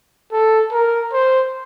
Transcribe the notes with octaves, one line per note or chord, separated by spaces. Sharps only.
A4
A#4
C5